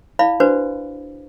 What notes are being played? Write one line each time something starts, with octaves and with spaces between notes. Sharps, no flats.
E4 D5 F5 B5
D4 F#4 B4 C5 D5